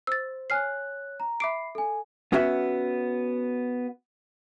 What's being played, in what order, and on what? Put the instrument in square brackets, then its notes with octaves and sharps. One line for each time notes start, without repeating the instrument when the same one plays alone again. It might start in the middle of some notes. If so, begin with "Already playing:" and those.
[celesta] C5 [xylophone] E6 A6
[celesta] C#5 F#6 [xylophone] G#5 F6 C7
[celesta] A#5
[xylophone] E5 D6 D7 [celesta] B5 C7
[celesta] A4 G#5
[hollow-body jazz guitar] B3 C#4 F#4 E5